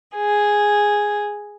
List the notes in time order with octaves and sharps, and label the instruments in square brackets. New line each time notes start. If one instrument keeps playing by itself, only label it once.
[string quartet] G#4